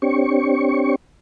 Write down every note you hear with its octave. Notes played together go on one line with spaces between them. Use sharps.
C4 D4 G4 C#5 C#6